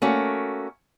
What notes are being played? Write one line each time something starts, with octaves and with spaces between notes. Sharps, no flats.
A3 A#3 C#4 F#4